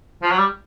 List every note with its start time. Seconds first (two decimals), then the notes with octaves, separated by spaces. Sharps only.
0.22 F3
0.31 F#3
0.38 G3